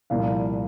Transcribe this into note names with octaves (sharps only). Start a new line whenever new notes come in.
C2 A#2 F3 F5